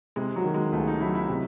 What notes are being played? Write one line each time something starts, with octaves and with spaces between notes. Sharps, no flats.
C3 G#3
F#3
D#3
G#3
C#2 A3
D#4
F#3 E4
E4
C3